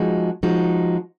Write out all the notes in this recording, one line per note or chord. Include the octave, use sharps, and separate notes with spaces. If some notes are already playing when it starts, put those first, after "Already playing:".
Already playing: F3 G#3 D#4 F#4
F3 G#3 D#4 F#4